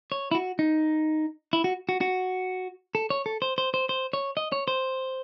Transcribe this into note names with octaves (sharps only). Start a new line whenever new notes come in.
C#5
E4
F#4
D#4
E4
F#4
F#4
F#4
A4
C#5
A4
C5
C5
C5
C5
C#5
D#5
C#5
C5